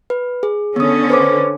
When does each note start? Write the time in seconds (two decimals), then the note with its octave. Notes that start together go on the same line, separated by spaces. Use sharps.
0.10 B4
0.43 G#4
0.76 D3 B3 C#4 D#6
1.10 B4 C5 D6